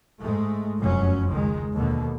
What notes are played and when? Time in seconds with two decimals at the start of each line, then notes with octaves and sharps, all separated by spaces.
0.21 G#2 G#3 A3
0.79 F1 F#2 F#3 C#4
1.29 C#2 D#3 G#3
1.73 D#2 B2 D3